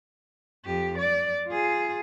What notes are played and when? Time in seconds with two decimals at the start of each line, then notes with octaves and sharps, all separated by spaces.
0.65 F2 G4
0.98 D5
1.47 F4 G#4